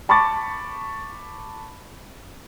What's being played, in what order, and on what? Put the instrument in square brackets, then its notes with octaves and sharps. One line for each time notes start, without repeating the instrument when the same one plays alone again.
[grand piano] A5 B5 C#6 D6 A6